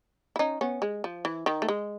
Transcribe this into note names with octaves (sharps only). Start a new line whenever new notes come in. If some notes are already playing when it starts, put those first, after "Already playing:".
E4
C#4 D#4
B3 C#4
G#3
F3
E3
D#3
A3
G#3